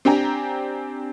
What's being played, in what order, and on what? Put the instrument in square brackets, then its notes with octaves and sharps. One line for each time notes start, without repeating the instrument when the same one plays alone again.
[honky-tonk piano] C4 D4 G4 G5 G#5 A#5